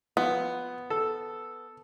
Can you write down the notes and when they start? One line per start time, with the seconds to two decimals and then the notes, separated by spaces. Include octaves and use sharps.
0.17 F3 B3
0.90 A4